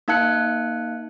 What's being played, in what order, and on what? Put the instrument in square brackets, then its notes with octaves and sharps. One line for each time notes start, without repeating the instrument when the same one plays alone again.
[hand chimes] A#3 D#4 F5 A5 F#6 C#7